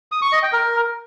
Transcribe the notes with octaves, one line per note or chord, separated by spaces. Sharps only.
D#6
C#6
D#5
G5
A#4